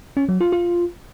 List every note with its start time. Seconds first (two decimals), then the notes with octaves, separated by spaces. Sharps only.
0.17 C#4
0.29 F#3
0.41 F4
0.52 F4